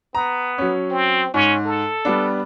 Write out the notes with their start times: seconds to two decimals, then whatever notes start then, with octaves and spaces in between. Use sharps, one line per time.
0.15 B3 A#5
0.58 F#3 C#4
0.91 C4
1.34 G#2 C#4
1.66 A4
2.05 G3 B3 D4